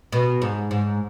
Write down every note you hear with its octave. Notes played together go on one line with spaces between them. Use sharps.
B2
G#2
G#2